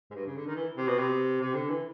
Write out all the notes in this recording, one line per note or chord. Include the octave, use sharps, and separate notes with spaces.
G#2
G2
C#3
D3
D#3
E3
C3
B2
C3
C3
D3
E3